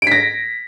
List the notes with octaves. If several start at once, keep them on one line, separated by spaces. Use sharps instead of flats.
A#6 B6 D7